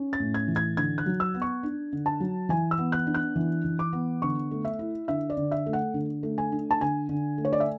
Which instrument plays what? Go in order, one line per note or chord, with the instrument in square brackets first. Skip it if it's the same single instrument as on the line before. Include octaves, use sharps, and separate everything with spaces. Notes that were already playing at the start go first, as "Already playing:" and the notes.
Already playing: [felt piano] C#4
A6
A2
G#6
E3
G#6
D3 G#6
F#6
F#3
E6
B3
C#6
D4
D3
A5
F#3
E3 G#5
E6
B3
F#6
D4
F#6
E3
E3
D6
B3
D3 C#6
A3
E5
E4
D3 E5
D5
D3
E5
A3
F#5
D3
A3
G#5
D4
A5
D3 G#5
D3
A3
C#5
D5
E5